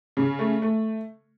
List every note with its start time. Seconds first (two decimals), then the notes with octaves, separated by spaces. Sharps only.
0.17 C#3
0.39 A3
0.62 A3